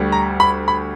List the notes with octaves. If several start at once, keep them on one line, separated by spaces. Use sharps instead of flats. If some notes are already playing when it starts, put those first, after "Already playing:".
Already playing: D2 D3 G3
A#5
B5
B5